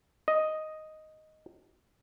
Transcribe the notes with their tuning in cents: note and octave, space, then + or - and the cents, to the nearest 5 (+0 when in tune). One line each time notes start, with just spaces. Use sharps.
D#5 +0